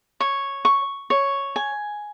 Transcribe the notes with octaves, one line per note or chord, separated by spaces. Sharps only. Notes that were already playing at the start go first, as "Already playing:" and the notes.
C#5
C#6
C#5
G#5